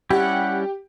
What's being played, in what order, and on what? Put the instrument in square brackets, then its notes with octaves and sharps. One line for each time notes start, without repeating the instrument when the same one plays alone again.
[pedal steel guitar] G3 C#4 E4 [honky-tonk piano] G4 [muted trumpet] F#5